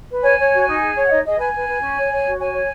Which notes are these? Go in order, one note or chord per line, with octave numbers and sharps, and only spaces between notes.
B4
C#5 G#5
C#5
F#4
D#4
G#4
C#5
F#5
D#4 D#5
G#4 D#5
B4 G#5
B4
B4
C#4
C#5
C#5
F#4
C#5 G#5
C#5